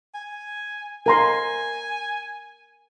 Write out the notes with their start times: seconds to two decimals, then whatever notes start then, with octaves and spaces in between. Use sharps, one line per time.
0.15 G#5
1.06 A#4 G#5 A#5 C6